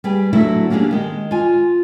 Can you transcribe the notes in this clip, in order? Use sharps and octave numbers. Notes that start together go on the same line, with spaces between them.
G3 G4 G#4 B4
D3 F#3 A3 E4 F#4
A#3 C#4 D4 G4 G#4
D#3 G#3
F4 G#5